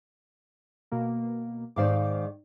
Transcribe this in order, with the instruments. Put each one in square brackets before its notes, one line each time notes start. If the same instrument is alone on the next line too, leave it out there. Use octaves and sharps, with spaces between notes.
[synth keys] B2 A#3
[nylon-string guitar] G#2 D#3 D5 [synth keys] C5 F5 D6